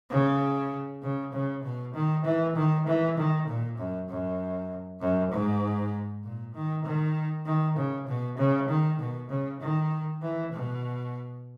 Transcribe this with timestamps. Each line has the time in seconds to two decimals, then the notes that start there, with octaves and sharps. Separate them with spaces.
0.10 C#3
1.02 C#3
1.33 C#3
1.64 B2
1.94 D#3
2.25 E3
2.56 D#3
2.87 E3
3.17 D#3
3.47 A#2
3.78 F#2
4.09 F#2
5.00 F#2
5.31 G#2
6.24 A#2
6.54 D#3
6.84 D#3
7.46 D#3
7.76 C#3
8.08 B2
8.38 C#3
8.69 D#3
8.99 B2
9.29 C#3
9.60 D#3
10.22 E3
10.52 B2